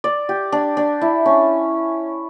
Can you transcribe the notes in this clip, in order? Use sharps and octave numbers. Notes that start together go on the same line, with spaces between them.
D5
G4
D4
D4
E4
C#4